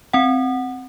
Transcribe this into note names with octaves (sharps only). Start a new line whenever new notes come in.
C4 F#5